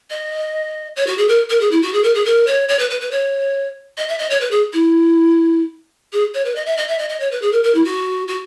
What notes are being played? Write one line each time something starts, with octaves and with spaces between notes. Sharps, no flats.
D#5
C#5
F#4
G#4
A#4
A#4
G#4
E4
F#4
G#4
A#4
G#4
A#4
C#5
C#5
B4
B4
B4
C#5
D#5
E5
D#5
C#5
B4
G#4
E4
G#4
C#5
B4
D#5
E5
D#5
E5
D#5
D#5
C#5
B4
G#4
A#4
A#4
E4
F#4
F#4